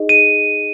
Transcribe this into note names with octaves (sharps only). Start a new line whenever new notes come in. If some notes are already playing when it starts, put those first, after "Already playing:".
Already playing: D#4 G#4 D#5
D#7